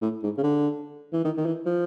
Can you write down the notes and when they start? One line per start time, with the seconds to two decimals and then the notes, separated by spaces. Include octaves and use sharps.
0.02 A2
0.23 G#2
0.38 C#3
0.43 D3
1.13 E3
1.25 D#3
1.37 D#3
1.46 E3
1.66 F3